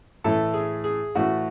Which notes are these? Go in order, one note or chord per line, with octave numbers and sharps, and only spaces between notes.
A2 E3 A3 A4
G#4
G#4
A2 E3 A3 F#4